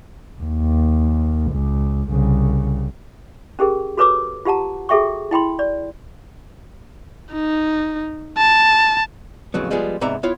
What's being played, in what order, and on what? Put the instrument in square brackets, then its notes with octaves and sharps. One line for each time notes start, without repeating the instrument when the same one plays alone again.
[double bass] D#2
C#2
C2 C#3
[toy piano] C#4 G4 G#4 A#4
F#4 A4 B4 C#5 D6 E6
F4 G4 F#5 A5 A#5
F#4 G#4 A4 E5 G5 C#6
E4 G5 B5 C6
D5
[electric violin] D#4
A5
[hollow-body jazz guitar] F2 A2 C#3 F#3 B3
F3 G3 G#3 B3 F4 G#4
G#2 C3 B3 D5 E5 A#5
B3 E4 F4 C#5 F5